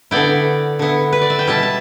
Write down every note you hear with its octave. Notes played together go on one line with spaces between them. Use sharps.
D3 B3 E4 D5 G5
D3 B3 E4
B4
D5
E5
G5
B2 G3 E4 E5 A5
A5